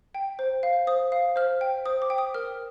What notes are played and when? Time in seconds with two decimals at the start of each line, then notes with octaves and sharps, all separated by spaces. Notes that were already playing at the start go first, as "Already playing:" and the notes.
0.15 G5
0.39 C5
0.63 F5
0.87 C5 D#6
1.12 F5
1.36 C5 F6
1.61 G5
1.86 C5 D#6
2.02 D6
2.10 G5
2.18 D#6
2.34 A#4 F6